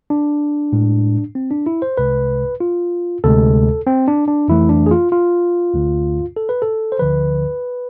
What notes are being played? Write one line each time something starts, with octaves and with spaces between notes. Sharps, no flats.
D4
A2 G#3
C4
D4
E4
C5
C2 C3 G#3 B4
F4
D2 C3 G#3 A4
C4
D4
D4
F2 E3 A3 E4
D4
G#4
F4
F4
D2 D3 A3
A4
B4
A4
C5
D2 D3 F3 B4